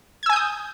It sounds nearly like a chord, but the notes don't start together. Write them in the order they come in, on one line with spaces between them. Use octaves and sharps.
G#6 E6 G#5 G6 D#6